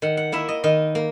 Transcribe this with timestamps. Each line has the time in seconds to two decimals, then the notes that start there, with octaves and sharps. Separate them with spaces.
0.02 D#3 F#5
0.17 F#5
0.32 A#3 E4 E5
0.49 D#5
0.64 D#3 D#5
0.95 A#3